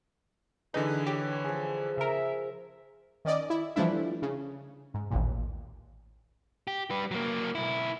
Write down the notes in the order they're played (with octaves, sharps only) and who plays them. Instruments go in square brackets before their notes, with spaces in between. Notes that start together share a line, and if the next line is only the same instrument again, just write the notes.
[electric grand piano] D3 E3 B4 [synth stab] D#4 [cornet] G#4
[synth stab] G4 [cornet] C#5
[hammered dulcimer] F3 G#4
[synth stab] C#3 A#4 [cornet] E5
[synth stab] D#3 C#4 D5 D#5
E4
E3 F3 G3 A3 D4 E4
C#3
G#2
A1 D#2 A#2
[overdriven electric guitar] G4
G3 B4
F#3 A#3
B1 E4